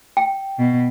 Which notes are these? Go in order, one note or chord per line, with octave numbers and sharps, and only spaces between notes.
G5
B2